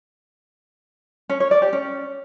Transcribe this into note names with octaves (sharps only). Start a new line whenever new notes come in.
C#4
C#5
D5
G4
C#4